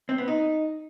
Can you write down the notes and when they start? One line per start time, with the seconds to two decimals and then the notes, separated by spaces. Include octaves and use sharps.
0.09 C4
0.18 B3
0.28 D#4